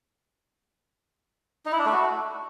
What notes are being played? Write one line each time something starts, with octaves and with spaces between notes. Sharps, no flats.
D#4
E4
D4
A3
F#4